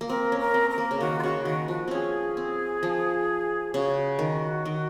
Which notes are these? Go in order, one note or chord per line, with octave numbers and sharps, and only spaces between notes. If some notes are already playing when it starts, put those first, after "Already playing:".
A#3
C4 A#4
C#4
A#4
C4
A#4
A#3
C#3
D#3 F#4
F4
C#3 F#4
D#3 F#4
F3 F#4
C4 C#4 G#4
C4
F3
C#3 F#4
D#3
D#3